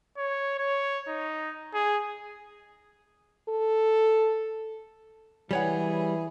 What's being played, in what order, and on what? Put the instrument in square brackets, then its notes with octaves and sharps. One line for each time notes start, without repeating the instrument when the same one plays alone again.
[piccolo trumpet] C#5
C#5
D#4
G#4
[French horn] A4
[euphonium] E3 [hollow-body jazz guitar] G3 C#5 F#5 [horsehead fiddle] G#4 G#5